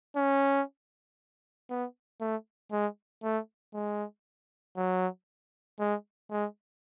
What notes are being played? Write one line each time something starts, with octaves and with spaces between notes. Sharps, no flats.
C#4
B3
A3
G#3
A3
G#3
F#3
G#3
G#3